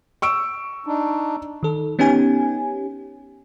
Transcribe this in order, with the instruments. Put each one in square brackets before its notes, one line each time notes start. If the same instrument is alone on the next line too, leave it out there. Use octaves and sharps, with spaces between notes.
[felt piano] C#6 E6 D7
[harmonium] D4 D#4
[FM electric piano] D#3 A4
B3 C#4 D#4 G4 G#5